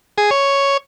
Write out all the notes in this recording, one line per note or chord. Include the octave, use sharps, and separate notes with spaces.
G#4
C#5